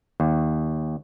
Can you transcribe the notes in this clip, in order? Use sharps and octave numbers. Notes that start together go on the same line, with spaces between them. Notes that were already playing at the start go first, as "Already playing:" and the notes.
D#2